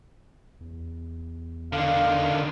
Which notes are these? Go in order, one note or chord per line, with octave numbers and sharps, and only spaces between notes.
E2
D3 D#3 F5